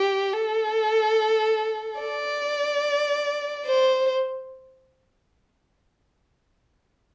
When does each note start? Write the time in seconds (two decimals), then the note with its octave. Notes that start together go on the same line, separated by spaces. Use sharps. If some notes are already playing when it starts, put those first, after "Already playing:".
Already playing: G4
0.34 A4
2.00 D5
3.66 C5